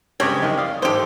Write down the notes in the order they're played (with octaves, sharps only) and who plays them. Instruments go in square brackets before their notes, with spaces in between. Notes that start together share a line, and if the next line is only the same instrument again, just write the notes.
[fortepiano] G2 C#3 G#3 [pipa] C4 G4 C#5
[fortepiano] C2 D#3 D#5
D5 F5 D#6
[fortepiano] A1 G#2 A4 [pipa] G4 C5